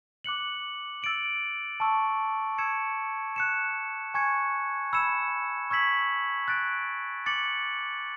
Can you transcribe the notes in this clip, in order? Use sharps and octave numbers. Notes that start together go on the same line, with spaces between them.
D6 F#6 C#7 F#7
E6 A6 D7 F#7
A5 C#6 E6
C#6 E6 G#6 C#7 E7
F#6 C#7 E7
G#5 C#6 G#6 C#7
B5 E6 G#6 C#7 E7
C#6 E6 G#6 B6 F#7
F#6 A6 D7
D6 A6 C#7 F#7